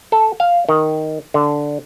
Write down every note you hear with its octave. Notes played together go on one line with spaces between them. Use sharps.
A4
F5
D#3
D3